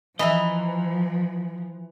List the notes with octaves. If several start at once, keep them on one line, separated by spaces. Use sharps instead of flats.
E3 F3 D#5 E5 A#5 B5